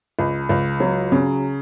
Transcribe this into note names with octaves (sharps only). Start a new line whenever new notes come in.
C#2
C#2
F#3
C#3